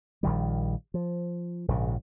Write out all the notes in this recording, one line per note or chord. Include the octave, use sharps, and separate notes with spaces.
A#1 D#3 G3
F3
A#1 G#2 C#3